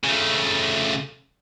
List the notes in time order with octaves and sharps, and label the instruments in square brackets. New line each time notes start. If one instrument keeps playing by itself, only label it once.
[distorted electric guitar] C#3 A3